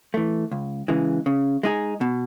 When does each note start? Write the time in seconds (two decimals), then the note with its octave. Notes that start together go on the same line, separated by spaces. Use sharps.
0.14 E3 A3
0.52 C#2
0.88 C#3 E3 G#3
1.26 C#3
1.63 G#3 D#4 G#4
2.01 B2